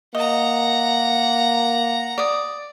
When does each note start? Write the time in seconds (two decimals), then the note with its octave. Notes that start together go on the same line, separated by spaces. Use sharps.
0.15 A#3 D#5 F#5 A#5
2.18 D5 D#6